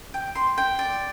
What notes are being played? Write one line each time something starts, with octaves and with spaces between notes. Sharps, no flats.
G5
C6
G5
D5